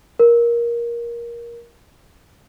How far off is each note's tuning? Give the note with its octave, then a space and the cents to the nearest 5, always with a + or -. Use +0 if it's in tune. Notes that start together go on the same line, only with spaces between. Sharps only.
A#4 +15